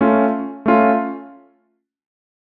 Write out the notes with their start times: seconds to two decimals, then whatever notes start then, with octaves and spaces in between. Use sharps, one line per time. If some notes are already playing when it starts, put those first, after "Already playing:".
0.01 A3 C#4 F4
0.66 A3 C#4 F4